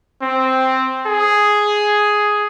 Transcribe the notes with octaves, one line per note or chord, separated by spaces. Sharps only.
C4
G#4